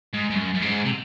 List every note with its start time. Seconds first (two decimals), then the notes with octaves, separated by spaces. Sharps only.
0.13 G#2
0.30 G#2
0.35 F#2
0.54 F#2
0.62 G#2
0.85 C3